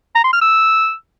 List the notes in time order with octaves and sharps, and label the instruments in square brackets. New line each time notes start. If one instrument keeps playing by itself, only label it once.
[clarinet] A#5
C6
F6
E6